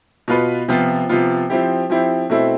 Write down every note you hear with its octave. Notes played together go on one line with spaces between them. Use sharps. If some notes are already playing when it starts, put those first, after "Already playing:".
B2 B3 F4 B4
C3 F3 B3 F4
C3 F3 B3 F4
F3 C4 E4 G4
F3 C4 E4 G4
B2 A3 C4 E4